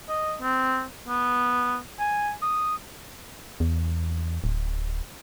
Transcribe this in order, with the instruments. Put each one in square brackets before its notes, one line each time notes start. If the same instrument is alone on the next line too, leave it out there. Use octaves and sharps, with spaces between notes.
[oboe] D#5
C4
B3
G#5
D#6
[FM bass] E2
D1